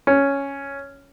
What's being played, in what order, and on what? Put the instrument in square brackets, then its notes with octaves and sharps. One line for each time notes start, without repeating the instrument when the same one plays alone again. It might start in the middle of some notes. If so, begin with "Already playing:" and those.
[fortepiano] C#4